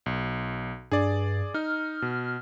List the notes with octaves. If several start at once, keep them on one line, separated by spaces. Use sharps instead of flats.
B1
G2 G#4 D5
D#4 F6
B2